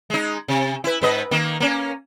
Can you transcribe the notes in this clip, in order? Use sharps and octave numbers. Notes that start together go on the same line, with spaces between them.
G#3 D#4
C3
E4 B4
G#2 B4 D#5
D#3 A#3
A#3 C#4